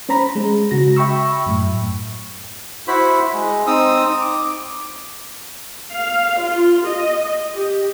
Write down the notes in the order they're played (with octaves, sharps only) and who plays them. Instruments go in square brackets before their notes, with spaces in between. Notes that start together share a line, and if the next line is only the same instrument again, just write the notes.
[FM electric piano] C#4 C5 A#5 B5 A#6
G#3
C#3 F#4 A#6
E5 G5 B5 C#6 E6
F#2 A2
[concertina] E4 F#4 C5 B5
G#3
C4 D#4 D#6 E6
D6
[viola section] F5
F4
D#5
G4